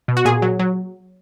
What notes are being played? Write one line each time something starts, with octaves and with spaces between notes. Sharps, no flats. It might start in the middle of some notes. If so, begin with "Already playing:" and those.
B2
F#4
A#2 G#4
F#3
F#3